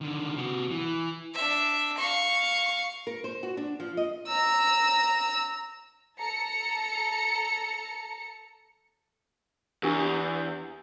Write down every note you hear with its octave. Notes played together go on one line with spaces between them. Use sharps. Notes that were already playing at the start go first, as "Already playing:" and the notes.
D3 D#3
C3 F#4
E3
D4 E5
F5 C#6
A#4
C5
F#4
D4
F3
D#5
A#5 E6
A4 A#5 C#7
E2 D4 G4 A#4